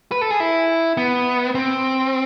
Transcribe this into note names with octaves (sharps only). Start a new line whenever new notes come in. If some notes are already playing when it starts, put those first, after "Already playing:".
B4
A4
G#4
E4
B3
C4